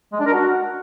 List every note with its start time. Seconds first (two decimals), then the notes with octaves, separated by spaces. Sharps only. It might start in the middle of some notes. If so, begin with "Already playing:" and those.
0.13 G#3
0.20 D4
0.27 A#4
0.34 F#4